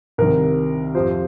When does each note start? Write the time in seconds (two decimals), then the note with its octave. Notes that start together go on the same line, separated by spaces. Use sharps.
0.18 C2 C3 D#3 A#4
0.95 F2 C3 F3 C5